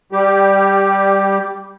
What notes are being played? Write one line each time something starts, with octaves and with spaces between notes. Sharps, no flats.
G3 G4